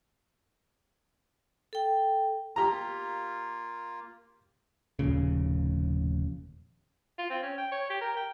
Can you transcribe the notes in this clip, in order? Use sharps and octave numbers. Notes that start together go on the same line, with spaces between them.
A4 G5
A#3 F4 G4 A#5
F1 D#2 A#2 C#3
F4
C4
C#4
G5
C#5
G4
A#4
G5